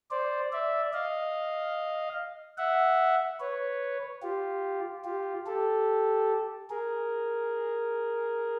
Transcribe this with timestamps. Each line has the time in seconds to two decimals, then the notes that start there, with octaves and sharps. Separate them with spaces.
0.11 C5 D5
0.52 D5 E5
0.93 D#5 F5
2.58 E5 F#5
3.40 B4 C#5
4.22 F4 G4
5.04 F4 G4
5.46 G4 A4
6.70 G#4 A#4